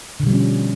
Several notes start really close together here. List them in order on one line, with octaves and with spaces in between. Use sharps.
D3 B2 G3 F3 C#4